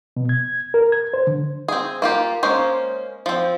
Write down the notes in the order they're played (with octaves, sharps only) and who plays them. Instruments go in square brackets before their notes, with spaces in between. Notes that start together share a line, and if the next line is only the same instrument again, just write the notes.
[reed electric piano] B2
G#6
A#4
G#6
C5
D3
[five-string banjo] C4 G#4
A#3 F4 G4
G#3 A#3 C#4 C5
F3 C4